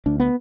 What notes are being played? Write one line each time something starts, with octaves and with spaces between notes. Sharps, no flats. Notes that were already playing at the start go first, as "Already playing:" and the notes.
D2 D4
B3